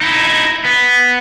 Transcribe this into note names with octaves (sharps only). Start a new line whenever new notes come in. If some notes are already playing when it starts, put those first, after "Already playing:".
D#4 E4
B3